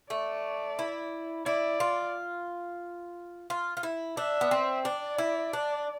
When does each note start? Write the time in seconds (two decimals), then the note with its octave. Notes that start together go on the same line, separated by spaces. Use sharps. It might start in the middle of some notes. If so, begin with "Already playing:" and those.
0.10 A3 D5
0.79 E4
1.46 E4 D5
1.80 F4
3.50 F4
3.77 F4
3.83 E4
4.17 D4 E5
4.41 B3
4.51 C4
4.85 D4 D5
5.18 E4
5.53 D4